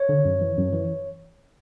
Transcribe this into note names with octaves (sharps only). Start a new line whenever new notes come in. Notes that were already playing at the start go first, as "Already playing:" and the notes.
Already playing: C#5
D3
F#2
E3
F#2
E3